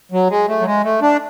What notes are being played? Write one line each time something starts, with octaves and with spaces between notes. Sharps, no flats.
F#3
G#3
A3
F#3
G#3
A3
D4